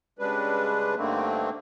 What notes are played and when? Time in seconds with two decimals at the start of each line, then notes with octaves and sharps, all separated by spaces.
0.19 C#3 G3 G#3 D4 B4
0.97 G2 D3 D#3 A3 A#3 C4